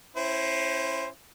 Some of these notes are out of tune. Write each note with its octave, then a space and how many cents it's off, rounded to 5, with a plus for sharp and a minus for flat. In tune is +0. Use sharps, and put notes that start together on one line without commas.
C#4 -30 E4 +10 C5 +0